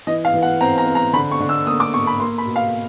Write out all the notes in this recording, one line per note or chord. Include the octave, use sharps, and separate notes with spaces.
E3 D#5
F5
E3
F#5
C4 A#5
A#5
C4
A#5
D3 B5
C#6
D3
E6
A#3 D#6
D6
A#3 C#6
B5
A#3 C6
B5
B2
F5